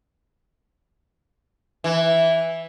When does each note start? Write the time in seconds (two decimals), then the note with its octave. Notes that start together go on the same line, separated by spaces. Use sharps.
1.84 E3